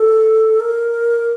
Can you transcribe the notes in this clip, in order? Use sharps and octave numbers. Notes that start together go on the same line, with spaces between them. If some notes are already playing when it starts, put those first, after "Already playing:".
Already playing: A4
A#4